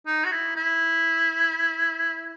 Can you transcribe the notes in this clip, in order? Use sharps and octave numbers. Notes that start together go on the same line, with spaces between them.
D#4
F#4
E4
E4